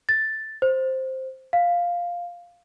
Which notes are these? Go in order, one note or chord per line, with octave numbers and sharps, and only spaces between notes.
A6
C5
F5